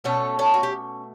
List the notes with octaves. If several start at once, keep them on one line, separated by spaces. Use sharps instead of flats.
B2 A3 C#4 A4 C#5
A4 C#5
F#4
G4